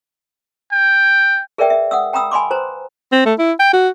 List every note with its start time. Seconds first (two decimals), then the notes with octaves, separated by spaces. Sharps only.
0.72 G5
1.58 G#4 A#4 B4 D5 E5 G5
1.70 E5
1.91 F#5 D#6 E6
2.13 G5 A#5 B5 D#6 E6
2.31 G#5 B5 C6 D6
2.51 B4 C5 A#5
3.12 C4
3.26 A3
3.39 E4
3.60 G5
3.73 F#4